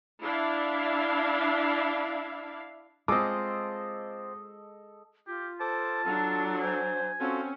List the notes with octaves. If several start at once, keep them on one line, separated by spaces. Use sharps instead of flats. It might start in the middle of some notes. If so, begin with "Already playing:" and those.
D4 E4 E5 F5
G#3 C4 F4 A4 D#5 D6
F4 G4
A4 C5 A5 D6
F#3 D4 A4
C5 G#5
C4 C#4 F4 F#4 A4